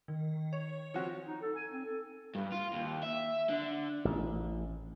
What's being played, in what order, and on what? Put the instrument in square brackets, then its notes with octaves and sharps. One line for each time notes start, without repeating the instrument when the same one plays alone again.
[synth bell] D#3
C#5
[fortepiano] F3 C4 F#4
[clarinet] D#4
A4
G#5
C4
A4
[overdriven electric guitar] G2
F4
D#2
E5
D3
[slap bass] A1